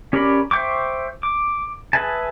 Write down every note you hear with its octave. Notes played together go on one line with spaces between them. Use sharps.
C#4 G4 A#4 D5 B5
C5 E5 G5 C#6 D6
D6
G#4 B4 E5 G#5 A5